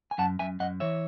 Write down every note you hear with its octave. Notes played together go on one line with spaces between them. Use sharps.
G#5
F#2 F#5 A5
F#2 E5 G#5
F#2 D#5 F#5
E3 C#5 E5